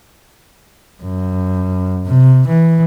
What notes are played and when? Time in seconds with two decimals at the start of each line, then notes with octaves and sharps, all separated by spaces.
1.02 F#2
2.05 C3
2.47 E3